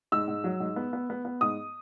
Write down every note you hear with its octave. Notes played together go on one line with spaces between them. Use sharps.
G#2 E6
G#2
F#3
G#2
B3
B3
B3
B3
G#2 D#6